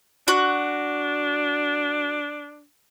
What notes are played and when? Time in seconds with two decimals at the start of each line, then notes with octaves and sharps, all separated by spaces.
0.28 D4 F#4